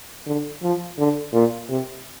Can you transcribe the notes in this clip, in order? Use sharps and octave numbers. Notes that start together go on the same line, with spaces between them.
D3
F3
D3
A#2
C3